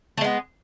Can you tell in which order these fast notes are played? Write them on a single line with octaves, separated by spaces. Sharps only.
A3 G#3 B3